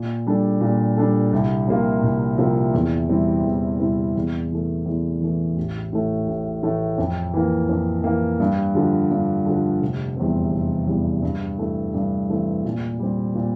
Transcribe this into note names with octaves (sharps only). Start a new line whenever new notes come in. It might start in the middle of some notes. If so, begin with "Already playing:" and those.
Already playing: A#2
G3 D4 A4
A#2
G3 D4 A4
C2
C3 F3 A#3 F4
C2
C3 F3 A#3 F4
E2
C3 G3 C4 E4
E2
C3 G3 C4 E4
E2
E3 A3
E2
E3 A3
A1
A2 E3 A3
A1
A2 E3 A3
F2
E3 A#3
F2
E3 A#3
G2
D3 F3
G2
D3 F3
F1
E2 C3 G3 C4
F1
E2 C3 G3 C4
G2
E3 A3 C4
G2
E3 A3 C4
A#2
G3 C4
A#2